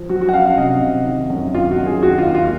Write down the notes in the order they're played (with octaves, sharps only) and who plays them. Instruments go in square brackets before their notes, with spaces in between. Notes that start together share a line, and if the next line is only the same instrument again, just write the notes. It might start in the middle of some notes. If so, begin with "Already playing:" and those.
Already playing: [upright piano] F3
F#3 F#4
F#4
F#5
C#4 F5
F5
C3 D#5
C3
D#3
F#2
D#3 F4
F#4
F#2
G#4
D#3 F#4
F4
D#2
F4